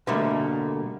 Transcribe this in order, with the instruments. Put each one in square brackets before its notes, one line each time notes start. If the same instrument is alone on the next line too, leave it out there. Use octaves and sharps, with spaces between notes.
[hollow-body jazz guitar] B2 D3 G3 A3 A#3